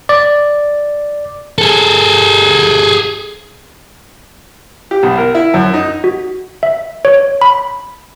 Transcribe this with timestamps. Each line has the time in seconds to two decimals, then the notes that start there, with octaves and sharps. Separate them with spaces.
0.09 D5
1.58 G#4 A4
4.91 G4
5.03 B1
5.18 A#4
5.35 E4
5.54 F#2
5.74 D#4
6.04 F#4
6.63 E5
7.05 C#5
7.42 B5